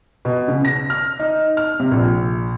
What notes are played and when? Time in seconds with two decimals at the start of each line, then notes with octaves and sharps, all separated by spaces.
0.25 B2
0.48 C#3
0.65 A#6
0.90 F6
1.19 D#4
1.57 F6
1.80 C3
1.91 A#1